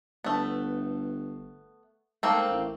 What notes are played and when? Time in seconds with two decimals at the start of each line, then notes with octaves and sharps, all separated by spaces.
0.24 G1 A3 B3
2.23 G#2 A3 A#3 C4
2.49 A1